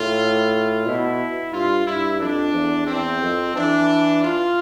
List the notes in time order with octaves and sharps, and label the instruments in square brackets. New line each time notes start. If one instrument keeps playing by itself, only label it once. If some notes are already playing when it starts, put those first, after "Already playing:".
Already playing: [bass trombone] A2 [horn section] F4
[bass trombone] B2 [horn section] E4
[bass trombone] G2 [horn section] F4
[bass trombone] G2 [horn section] E4
[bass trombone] F2 [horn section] D4
[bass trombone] E2
[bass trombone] E2 [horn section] C4
[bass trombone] F2
[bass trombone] E3 [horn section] D4
[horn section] F4